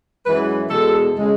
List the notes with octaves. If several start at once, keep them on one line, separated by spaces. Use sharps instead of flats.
F#2 E3 G#3 B4
E2 B2 G#3 A4
C#3 G#3